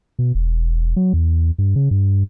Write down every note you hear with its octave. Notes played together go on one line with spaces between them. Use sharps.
B2
E1
F#3
E2
G2
C#3
G2